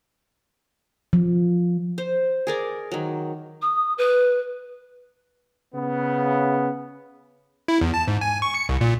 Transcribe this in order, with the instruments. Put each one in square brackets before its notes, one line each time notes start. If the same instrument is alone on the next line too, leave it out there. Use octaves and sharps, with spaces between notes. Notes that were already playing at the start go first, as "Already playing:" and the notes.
[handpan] F3
[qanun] C5
G#4 A#4 D5
D#3 F#3
[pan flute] D#6
B4
[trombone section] C#3 B3
[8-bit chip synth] E4
E2
A5
G#2
G#5
C#6
C#7
C2
A#2